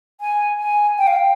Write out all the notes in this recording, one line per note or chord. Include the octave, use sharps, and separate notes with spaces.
G#5
G#5
G5
F5
G5